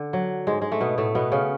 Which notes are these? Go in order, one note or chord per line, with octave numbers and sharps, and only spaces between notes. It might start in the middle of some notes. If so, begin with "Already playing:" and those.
Already playing: D3
F#3
G#2 G#3
G#3
A3
B2 B3
A2 A3
B2 B3
C#3 C#4